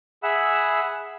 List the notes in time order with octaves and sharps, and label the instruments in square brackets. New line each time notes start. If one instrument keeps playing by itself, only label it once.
[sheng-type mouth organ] G#4 E5 F#5 B5 E6